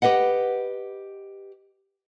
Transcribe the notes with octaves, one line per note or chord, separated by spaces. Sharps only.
G4 A4 B4 D#5 F#5